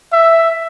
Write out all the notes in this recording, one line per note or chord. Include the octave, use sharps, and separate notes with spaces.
E5